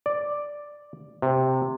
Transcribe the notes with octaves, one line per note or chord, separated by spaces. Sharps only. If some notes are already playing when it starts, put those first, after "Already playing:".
D5
C3